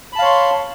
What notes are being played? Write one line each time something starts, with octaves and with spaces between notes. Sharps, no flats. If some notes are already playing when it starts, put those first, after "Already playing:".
C#5 F5 A5 B5 C6